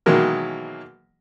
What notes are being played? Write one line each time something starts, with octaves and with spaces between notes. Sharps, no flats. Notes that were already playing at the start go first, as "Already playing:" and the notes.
B2 D#3 E3 F#3 G#3 A#3